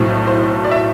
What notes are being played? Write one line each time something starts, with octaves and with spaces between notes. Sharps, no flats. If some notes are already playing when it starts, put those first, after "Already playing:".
Already playing: B1 A2 F#3 A3 C4
C5
D5
E5